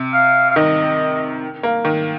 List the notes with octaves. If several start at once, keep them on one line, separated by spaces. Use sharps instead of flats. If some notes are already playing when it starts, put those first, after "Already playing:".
Already playing: C3
F5
F5
D#3 D#5
A#3
D#3